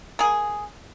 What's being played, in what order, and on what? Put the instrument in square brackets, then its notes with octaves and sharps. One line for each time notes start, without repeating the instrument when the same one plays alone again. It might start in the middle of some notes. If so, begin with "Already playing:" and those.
[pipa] A#3 G#4